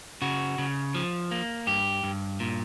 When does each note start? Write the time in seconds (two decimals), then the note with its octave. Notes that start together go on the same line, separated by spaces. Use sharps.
0.22 C#3 F#4
0.58 C#3
0.94 F3
1.31 A#3
1.67 G2 G4
2.04 G2
2.40 A#2